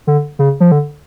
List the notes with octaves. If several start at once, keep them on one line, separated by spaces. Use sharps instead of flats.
D3
C#3
F3
D3